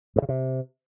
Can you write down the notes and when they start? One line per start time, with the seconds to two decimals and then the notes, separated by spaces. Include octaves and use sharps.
0.16 G2
0.22 C#3
0.29 C3